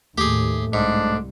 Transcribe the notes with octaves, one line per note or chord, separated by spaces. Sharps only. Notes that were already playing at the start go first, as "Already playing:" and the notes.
D#2 A2 A3 G4 G#4
C2 G#2 D4